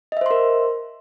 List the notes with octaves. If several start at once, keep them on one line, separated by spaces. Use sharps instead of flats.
A#4 C5 D#5 E5 C6